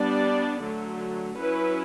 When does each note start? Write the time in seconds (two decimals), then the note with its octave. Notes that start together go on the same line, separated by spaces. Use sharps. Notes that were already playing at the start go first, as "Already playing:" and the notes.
Already playing: G3 B3 D4 D5
0.62 D3 F#3 A3
1.38 F#3 C#4 E4 B4